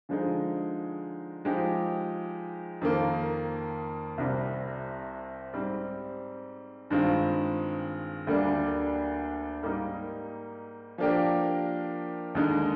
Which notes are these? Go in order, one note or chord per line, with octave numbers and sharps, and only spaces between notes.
D3 F3 G#3 D#4 G#4
F3 G#3 D#4 G4
F2 D#3 A#3
C2 C3 G3
G#2 G3 C4
G2 D#3 G#3 C4 F4
D2 D3 G3 A#3 D4
G#2 G3 A#3 D#4
F3 A#3 D4 G4 A#4
D#2 D3 G#3 D#4